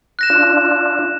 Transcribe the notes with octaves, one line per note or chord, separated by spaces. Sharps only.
F#6 A#6 E7
D4 F4